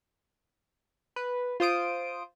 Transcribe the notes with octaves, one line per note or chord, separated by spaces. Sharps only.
B4
F4 C5 D#6 D7